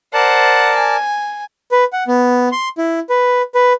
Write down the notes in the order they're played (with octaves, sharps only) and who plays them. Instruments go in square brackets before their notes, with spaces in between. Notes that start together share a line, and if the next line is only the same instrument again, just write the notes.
[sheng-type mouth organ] A#4 D5 A5 [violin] C5 F#5
[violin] G#5
[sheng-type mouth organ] B4
F#5
B3
C6
E4
B4
B4